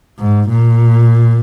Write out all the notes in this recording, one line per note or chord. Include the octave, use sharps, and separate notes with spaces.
G#2
A#2